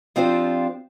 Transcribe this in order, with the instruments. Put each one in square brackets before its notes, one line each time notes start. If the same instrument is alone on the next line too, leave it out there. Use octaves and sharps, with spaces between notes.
[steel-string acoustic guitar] F3 C4 D4 F4 G4 C5